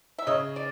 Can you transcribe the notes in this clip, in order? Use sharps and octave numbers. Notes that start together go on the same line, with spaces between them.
E5
C#3 C#5 D#5
D5